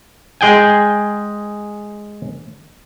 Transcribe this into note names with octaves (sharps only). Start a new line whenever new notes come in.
G#3 G#4 G5 G#5